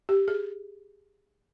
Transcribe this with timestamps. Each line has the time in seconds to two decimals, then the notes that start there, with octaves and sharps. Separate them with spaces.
0.09 G4
0.28 G#4